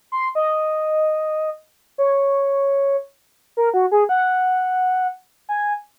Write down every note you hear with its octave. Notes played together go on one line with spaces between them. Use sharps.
C6
D#5
C#5
A#4
F#4
G#4
F#5
G#5